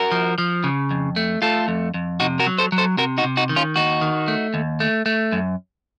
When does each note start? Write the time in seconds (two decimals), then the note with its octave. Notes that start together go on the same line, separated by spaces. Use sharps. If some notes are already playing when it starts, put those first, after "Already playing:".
Already playing: F#4 A#4
0.12 F3
0.38 F3
0.64 C#3
0.91 F2
1.16 A3
1.42 A3 F4 A4
1.68 F2
1.94 F2
2.20 C3 D#4 F#4
2.39 F#4 A#4
2.47 F#3
2.58 A4 C5
2.72 F#3
2.78 A4 C5
2.97 C3 F#4 A#4
3.18 D#4 F#4
3.24 C3
3.37 D#4 F#4
3.49 D#3
3.56 C#4 F4
3.76 D#2 D#4 F#4
4.01 D#3
4.28 A3
4.54 D#2
4.80 A3
5.06 A3
5.32 F#2